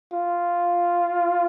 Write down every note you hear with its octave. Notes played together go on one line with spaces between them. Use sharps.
F4